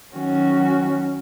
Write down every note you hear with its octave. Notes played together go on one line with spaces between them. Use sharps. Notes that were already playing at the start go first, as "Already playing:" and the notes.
D#3 F#3 C#4 F#4